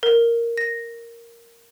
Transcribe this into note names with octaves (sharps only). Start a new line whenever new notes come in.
A#4
A#6